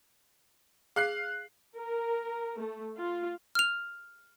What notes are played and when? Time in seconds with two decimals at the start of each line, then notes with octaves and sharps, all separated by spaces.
0.96 G#4 F5 F#6 C7
1.75 A#4
2.58 A3
2.96 F4
3.55 F6 F7